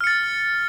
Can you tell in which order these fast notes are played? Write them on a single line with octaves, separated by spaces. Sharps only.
F6 C#7 A6